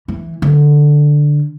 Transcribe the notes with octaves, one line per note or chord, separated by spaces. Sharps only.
E3
D3